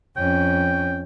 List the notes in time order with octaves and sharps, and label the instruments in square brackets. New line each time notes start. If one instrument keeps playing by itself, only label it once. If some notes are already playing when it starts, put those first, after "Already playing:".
[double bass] F2 C#4 [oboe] G5